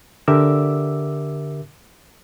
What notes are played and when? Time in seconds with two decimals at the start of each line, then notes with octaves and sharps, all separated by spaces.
0.28 D3 G4 A#4 E5 D6 E6